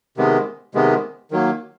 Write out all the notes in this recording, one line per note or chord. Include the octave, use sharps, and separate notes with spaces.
C3 D#3 G#3 B3
C3 D#3 G#3 B3
D#3 F#3 A#3